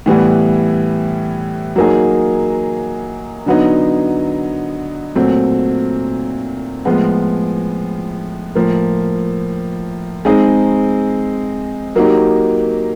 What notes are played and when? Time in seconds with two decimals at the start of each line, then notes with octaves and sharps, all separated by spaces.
0.06 A2 E3 G3 B3
1.76 F#3 A#3 D#4 G#4
3.46 D3 F#3 B3 D#4
5.15 A#2 F#3 A3 C4
6.85 A2 F3 G#3 B3
8.55 A2 F3 A#3
10.25 G#3 C4 D#4 G#4
11.96 F#3 A#3 D#4 G4